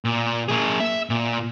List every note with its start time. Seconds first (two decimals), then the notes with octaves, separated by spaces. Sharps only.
0.05 A#2
0.49 A#3 G#4
0.80 E5
1.10 A#2